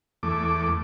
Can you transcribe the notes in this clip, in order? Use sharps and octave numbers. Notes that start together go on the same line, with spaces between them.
E2 A3 D6